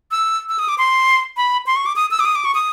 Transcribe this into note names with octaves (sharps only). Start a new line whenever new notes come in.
E6
E6
D#6
D6
C6
B5
C6
C#6
D6
D#6
E6
D6
D#6
D6
C#6
D#6